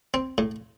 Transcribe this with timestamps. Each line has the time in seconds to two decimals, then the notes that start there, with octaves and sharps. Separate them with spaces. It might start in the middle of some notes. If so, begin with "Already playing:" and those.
0.14 C4
0.38 A2